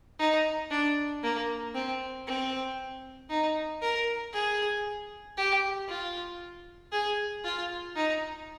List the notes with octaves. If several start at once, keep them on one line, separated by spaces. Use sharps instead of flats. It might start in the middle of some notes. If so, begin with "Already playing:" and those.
D#4
D4
A#3
C4
C4
D#4
A#4
G#4
G4
F4
G#4
F4
D#4